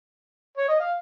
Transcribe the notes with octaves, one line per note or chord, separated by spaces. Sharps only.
C#5
D#5
F5